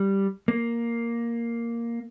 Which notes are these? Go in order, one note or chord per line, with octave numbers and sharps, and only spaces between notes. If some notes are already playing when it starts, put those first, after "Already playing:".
Already playing: G3
A#3